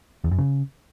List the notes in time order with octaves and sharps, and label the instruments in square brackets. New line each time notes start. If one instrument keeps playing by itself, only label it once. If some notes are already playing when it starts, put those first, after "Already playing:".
[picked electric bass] E2
F#2
C#3